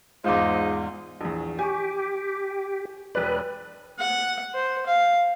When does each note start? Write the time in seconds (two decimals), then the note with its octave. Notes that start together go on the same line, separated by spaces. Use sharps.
0.24 E2 G#2 D#4 F4 C5 D6
1.21 A#1 E2
1.59 G4 G#5 C#6
3.15 E1 B4 D5
3.99 F#5
4.54 C5
4.86 F5